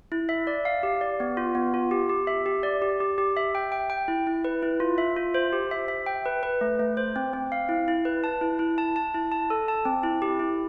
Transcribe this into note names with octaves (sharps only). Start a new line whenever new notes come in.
E4
E5
D5
F5
G4
D5
B3
F4
B3
F4
G4
G4
E5
G4
D5
G4
G4
G4
E5
G5
G5
G5
E4
E4
B4
E4
F4
E5
F4
C5
G4
E5
E5
G5
B4
B4
A3
A3
C5
C4
C4
F5
E4
E4
B4
A5
E4
E4
A5
A5
E4
A5
A4
A5
C4
E4
G4
E4